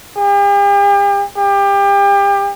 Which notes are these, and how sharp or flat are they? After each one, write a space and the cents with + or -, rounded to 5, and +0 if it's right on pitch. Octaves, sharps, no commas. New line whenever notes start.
G4 +45
G4 +30